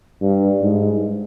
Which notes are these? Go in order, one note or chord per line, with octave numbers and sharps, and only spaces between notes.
G2
G#2